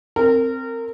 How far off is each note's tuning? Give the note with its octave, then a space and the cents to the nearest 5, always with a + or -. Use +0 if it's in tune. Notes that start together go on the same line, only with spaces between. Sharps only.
C4 +0 A#4 -25